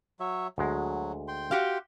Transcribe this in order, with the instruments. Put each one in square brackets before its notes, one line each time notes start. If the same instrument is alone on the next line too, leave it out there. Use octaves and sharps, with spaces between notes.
[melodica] F#3 C#5 E5
[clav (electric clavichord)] D2 G#3 [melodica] F#3
[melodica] G5 C6
[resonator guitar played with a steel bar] F#4 G4 F5